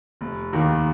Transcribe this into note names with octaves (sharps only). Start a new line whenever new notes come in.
F1
D#2 D#3